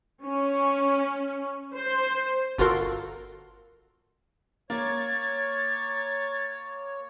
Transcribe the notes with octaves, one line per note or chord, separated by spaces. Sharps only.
C#4
C5
G1 F4 F#4 A4 A#4 C6
A#3 C#5 G#6 A6